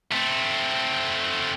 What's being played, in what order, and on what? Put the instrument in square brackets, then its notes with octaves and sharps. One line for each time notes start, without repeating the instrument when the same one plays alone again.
[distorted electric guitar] A3 C4